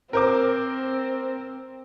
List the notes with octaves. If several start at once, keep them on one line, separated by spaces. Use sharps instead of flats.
C4 A#4 C5 D6